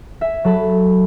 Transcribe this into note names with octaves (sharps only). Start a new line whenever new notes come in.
E5 G#5
F#3 A4 A5 B5